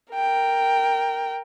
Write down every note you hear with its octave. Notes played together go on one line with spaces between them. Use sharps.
A#4 G5